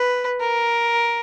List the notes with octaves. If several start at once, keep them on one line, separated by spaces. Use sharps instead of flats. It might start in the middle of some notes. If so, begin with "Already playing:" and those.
Already playing: B4
A#4